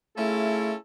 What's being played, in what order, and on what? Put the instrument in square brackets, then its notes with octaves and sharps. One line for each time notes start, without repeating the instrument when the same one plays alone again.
[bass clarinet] A3 [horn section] C#4 F4 A4 [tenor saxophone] E4 [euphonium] G#4